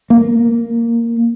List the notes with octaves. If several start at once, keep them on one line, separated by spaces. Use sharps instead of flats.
A#3